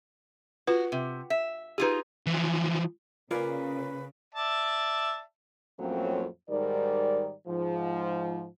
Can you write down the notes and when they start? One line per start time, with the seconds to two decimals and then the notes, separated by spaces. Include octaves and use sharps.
0.67 F4 F#4 B4
0.92 C3
1.30 E5
1.78 D#4 F4 G4 G#4 B4
2.27 E3 F3
3.31 A#2 C#3 F4 A#4 B4 D5 G#5
4.35 D5 E5 A5
5.79 F2 A2 F#3 A#3 C4 C#4
6.50 G#2 D#3 G3 A#4 D5
7.47 G#2 F3